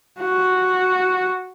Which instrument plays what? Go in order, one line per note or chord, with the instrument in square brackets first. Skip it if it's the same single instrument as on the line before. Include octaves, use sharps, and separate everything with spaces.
[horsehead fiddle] F#4